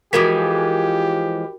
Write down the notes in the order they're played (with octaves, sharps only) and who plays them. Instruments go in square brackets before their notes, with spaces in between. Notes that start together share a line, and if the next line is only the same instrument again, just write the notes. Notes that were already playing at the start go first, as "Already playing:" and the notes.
[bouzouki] E3 F3 G#3 [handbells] F#4 A#4 B6 [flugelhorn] G4